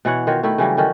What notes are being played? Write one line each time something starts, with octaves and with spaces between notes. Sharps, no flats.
B2 E3 C#5 F#5
D#3 F4 F#4 C#5
D#3 A3 E4
C#3 E3 F#3 G3
D3 D#3 C#4